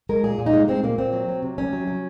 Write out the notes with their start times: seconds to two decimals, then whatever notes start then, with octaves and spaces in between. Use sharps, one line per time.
0.09 G#3 A#4
0.24 A#2 G#4
0.38 A#2
0.46 D#4
0.53 G#3
0.68 G#3 C4
0.83 A#2 A#3
0.98 A#2 C4
1.13 F#3
1.28 F#3
1.42 C3
1.58 C3 C#4
1.73 F#3
1.88 F#3